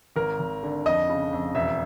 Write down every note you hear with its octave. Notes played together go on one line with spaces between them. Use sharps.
G#1 A#4
G#1
D3
F2 D#5
C#3
F2
E1 E5